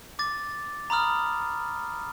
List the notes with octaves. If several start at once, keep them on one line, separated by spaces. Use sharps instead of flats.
D6 A6
A#5 B5 D#6 F6